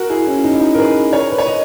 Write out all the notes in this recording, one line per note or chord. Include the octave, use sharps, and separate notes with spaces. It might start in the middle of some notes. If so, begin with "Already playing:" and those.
Already playing: F#4 A#4
E4 G#4
C#4 E4
D#4
E4
D#4
A#4
G#4 B4
A#4 C#5
B4
C#5
B4 D#5